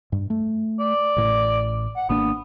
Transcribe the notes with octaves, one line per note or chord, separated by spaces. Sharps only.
G2
A3
D5
A1 A2
F#5
G#1 A#3 B3 D4